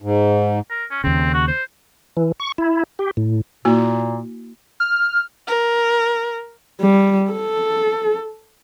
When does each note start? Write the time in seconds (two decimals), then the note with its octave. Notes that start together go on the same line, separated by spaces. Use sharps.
0.02 G#2
0.70 A#4
0.91 C#4
1.04 D#2 C#3 C4
1.34 F#4
1.48 C5
2.17 E3
2.40 C#6
2.58 E4
2.99 G4
3.17 A2
3.65 A#2 A#3 E4 F#4
4.80 F6
5.47 A#4
6.81 G3
7.31 A4